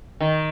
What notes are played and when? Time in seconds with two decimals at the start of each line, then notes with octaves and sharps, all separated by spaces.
0.21 D#3